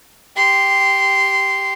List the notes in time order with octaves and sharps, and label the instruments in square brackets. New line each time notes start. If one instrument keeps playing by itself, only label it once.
[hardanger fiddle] G4 C6